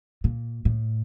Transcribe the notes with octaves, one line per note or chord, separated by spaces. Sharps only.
A#2
A2